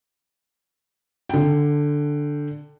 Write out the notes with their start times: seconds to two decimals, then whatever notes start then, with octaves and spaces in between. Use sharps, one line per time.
1.29 D3 G5